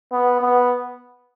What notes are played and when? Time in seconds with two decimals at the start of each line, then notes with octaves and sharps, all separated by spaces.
0.12 B3
0.41 B3